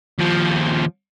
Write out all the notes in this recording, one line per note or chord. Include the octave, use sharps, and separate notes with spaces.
D#2 F3